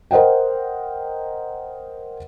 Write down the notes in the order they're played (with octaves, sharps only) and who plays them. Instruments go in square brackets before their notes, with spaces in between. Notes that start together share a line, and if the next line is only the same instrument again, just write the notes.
[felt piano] A#4 C5 D#5 F#5 G5